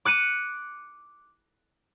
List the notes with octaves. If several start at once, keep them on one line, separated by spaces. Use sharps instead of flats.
D6 F#6 C#7 D#7